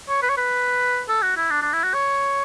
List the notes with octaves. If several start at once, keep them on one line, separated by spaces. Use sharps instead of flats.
C#5
B4
C#5
B4
A4
F#4
E4
D4
D4
E4
F#4
C#5